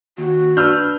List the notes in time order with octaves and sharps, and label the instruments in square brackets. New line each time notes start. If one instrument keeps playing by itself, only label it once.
[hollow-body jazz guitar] D#2 [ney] F#4
[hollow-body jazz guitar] D4 B4 [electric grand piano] E6 F6 G6